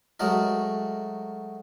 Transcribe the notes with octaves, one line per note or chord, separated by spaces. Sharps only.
F#3 G#3 A3 A#4